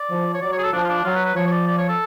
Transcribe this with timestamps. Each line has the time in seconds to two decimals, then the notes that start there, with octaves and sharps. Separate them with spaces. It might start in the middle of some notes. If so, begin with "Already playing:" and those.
Already playing: D5
0.10 F3
0.34 C#5
0.42 F#3 D5
0.52 C#5
0.58 G#4
0.63 A4
0.73 F3 D4
0.84 F4
0.89 D4
1.05 F#3 F4
1.15 B4
1.26 B4
1.36 F3 C#5
1.47 C#5
1.52 D5
1.68 D5
1.78 C#5
1.89 A4